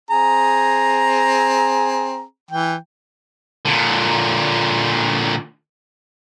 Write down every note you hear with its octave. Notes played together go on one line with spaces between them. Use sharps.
C4 G#4 A#5
E3 G5
A#2 D3